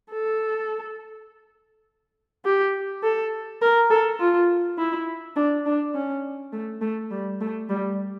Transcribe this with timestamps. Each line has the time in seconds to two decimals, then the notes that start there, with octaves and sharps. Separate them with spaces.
0.12 A4
2.45 G4
3.03 A4
3.62 A#4
3.90 A4
4.20 F4
4.78 E4
5.36 D4
5.66 D4
5.95 C#4
6.52 A3
6.81 A3
7.11 G3
7.41 A3
7.70 G3